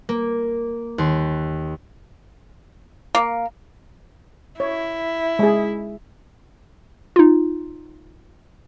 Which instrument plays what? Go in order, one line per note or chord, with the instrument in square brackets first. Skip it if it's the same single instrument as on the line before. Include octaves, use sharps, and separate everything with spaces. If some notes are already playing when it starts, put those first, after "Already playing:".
[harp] A#3
D#2 C6
[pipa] A#3
[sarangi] E4 [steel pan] C#5
[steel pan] G#3 G#4
[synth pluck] D#4 F4